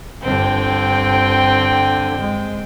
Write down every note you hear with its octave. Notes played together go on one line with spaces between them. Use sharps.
G1 D3 C4 G5
G#3